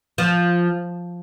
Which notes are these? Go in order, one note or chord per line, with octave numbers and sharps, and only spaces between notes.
F3